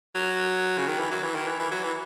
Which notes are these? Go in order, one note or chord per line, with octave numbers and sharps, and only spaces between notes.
F#3
C#3
D#3
E3
F#3
E3
D#3
E3
E3
F#3
E3